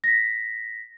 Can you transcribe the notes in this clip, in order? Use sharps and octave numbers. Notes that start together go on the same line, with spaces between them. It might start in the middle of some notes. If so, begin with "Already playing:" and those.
A#6 B6